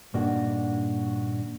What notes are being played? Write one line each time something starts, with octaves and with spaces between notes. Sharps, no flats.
G2 A#2 D#3 A#3 D4 F#4